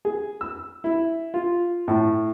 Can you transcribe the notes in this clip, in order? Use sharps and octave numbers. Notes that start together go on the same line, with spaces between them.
G#4
E6
E4
F4
A2